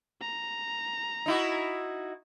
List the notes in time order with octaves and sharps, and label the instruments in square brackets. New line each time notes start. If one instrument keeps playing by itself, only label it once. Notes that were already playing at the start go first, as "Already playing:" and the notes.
[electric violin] A#5
[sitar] D#4 E4 F#4